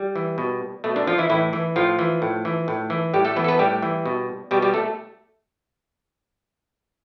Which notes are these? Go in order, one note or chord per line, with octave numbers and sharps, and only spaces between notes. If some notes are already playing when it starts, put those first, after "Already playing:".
Already playing: G3
E3
B2
B2 A3
D3 D4
F3 F4
E3 E4
A2 E3 E4
E3
A2 F3 F4
E3
A2
E3
A2
E3
A2 G3 G4
A3 A4
E3 B3 B4
A4
B3 B4
A2 G3 G4
E3
B2
B2 G3 G4
G3 G4
A3 A4